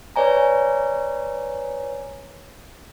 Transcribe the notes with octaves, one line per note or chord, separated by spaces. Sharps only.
B4 C#5 D5 G#5 A#5